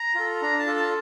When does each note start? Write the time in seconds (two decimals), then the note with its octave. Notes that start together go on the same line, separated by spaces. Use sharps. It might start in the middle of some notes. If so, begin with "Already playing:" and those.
Already playing: A#5
0.15 F4 A4
0.42 D4 A#5
0.59 A5
0.67 F4 A4
0.76 A5